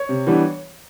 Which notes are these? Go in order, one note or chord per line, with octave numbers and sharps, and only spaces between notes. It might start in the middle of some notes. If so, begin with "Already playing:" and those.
Already playing: C#5
C3
E3 G3 B3 D4